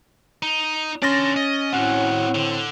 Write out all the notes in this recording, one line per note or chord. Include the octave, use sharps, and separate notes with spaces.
D#4
C#4 D4 C6 A6 A#6
D#5
A2 C4 F#4 F#5
D3 C4